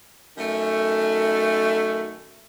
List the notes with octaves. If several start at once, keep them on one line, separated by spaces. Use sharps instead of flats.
F#2 D#3 A3